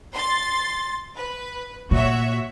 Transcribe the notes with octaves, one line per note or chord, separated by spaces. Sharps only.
C6 A6
B4
A#2 F#4 C#5 E5